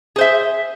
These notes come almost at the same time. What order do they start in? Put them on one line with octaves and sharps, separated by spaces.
G#4 C5 E5